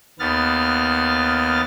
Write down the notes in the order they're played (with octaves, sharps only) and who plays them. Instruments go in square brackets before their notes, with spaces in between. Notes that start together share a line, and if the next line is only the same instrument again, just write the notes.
[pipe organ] D#2 B3 F6 A6